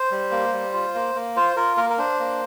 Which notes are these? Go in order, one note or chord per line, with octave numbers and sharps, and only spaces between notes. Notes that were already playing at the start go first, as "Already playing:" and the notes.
Already playing: C5
G3
A#3
G3
F4
A#3
A#3
F4 C5
F4 A#4
A#3 A#4
A#4
D4 C5
A#3